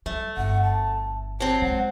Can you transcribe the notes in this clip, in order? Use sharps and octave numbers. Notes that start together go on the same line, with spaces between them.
G3 A3
G1 F#5
A5
F#3 C4 A5
G#3 F#5